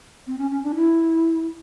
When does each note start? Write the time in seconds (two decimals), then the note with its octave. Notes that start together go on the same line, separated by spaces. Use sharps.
0.27 C4
0.38 C#4
0.51 C#4
0.63 D4
0.76 E4